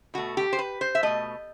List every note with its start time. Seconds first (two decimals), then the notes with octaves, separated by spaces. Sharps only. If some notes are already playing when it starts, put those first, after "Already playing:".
0.14 B2 A3 F#4
0.37 G4
0.53 C5
0.59 B4
0.81 C5
0.95 E5
1.03 B2 A3 D#5